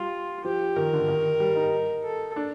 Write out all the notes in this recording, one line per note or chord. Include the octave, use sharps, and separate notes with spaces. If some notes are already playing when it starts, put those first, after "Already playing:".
Already playing: G3 F4
F3 G4
D#3 A#4
D3
D#3
G3
D#4
A4
D4